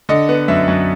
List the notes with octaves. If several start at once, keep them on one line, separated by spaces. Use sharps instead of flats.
D3 D#5
B3
F#2 E5
F#2